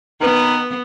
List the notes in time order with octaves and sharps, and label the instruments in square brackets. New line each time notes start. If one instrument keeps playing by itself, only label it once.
[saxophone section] D#3 B4 [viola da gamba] B3